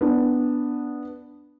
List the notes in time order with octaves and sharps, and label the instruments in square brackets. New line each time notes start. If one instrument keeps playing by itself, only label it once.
[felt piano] B3 D4